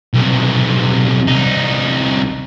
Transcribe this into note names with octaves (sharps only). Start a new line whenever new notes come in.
B1 C3
C2 D#4